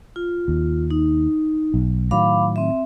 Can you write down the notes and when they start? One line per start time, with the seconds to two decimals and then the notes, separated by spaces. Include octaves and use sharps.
0.16 F4
0.48 D#2
0.91 D#4
1.74 B1
2.11 A2 D#3 F#3 F5 B5 D6
2.56 C4 E5